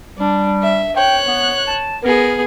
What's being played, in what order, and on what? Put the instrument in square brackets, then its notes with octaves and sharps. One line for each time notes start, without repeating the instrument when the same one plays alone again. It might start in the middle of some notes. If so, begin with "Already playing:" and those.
[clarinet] G3 [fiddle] D4
[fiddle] E5
[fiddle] C#5 F#6 [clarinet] G5
[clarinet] B3
A5
[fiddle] B3 G#4 [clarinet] A#4